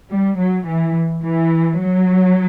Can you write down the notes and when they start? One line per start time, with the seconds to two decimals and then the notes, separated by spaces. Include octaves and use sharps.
0.10 G3
0.38 F#3
0.67 E3
1.24 E3
1.81 F#3